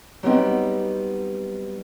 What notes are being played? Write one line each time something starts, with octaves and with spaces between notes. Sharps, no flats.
F#3 G3 B3 C4 D#4